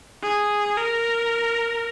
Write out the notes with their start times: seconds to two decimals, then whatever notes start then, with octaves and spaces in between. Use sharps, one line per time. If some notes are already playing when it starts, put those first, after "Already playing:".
0.22 G#4
0.77 A#4